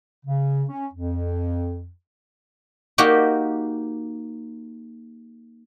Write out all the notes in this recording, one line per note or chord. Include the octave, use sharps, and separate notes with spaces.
C#3
C#4
F2
A#3 D#4 F#4 G4